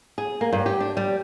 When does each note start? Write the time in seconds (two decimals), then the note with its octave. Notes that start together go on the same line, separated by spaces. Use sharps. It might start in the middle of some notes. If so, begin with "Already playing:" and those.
0.18 G#4
0.41 A#3
0.52 G2
0.66 G4
0.80 D4
0.97 G3